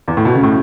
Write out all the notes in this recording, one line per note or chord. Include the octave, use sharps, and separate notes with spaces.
E2
A2
B2
C#3
A2